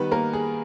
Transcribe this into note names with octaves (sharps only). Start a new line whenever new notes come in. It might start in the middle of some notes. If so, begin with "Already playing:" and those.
Already playing: D#3 G3 B3 D#4 B4
A#3 A#4
G#4